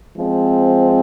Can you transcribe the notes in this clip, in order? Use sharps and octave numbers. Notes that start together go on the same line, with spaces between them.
F3 G#3 C4